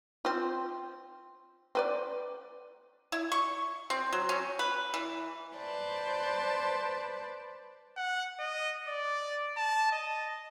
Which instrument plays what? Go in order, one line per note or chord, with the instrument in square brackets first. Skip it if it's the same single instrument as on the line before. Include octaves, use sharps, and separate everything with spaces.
[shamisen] C4 F4
C4 B4 D5
[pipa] E4
C#6
C4
F#3
C#4
B4
E3
[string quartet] B4 C5 D5 A5
[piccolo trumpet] F#5
D#5
D5
A5
D#5